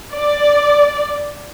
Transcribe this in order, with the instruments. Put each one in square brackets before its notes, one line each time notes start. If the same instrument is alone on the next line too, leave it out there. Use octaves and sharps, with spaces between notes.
[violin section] D5